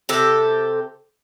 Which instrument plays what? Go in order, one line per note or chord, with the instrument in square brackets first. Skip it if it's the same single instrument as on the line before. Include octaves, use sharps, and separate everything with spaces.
[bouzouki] C3 G4 A4